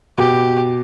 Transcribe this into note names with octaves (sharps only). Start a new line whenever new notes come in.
B2 G4